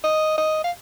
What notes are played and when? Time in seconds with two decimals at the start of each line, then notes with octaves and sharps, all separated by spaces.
0.04 D#5
0.38 D#5
0.64 F5